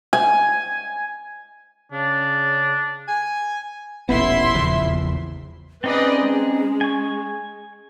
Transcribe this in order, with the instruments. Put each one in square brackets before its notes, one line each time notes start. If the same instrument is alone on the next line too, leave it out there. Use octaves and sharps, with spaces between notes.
[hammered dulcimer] G#5
[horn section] C#3 [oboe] D4
[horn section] G#5
[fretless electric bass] D#1 A1 B3 [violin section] E4 E5 C6
[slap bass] E2 C#3 F3
[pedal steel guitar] C4 D#4 G#4 [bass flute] C#4 [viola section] B4 D5 D#5
[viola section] G#3
[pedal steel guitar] G#5 C#6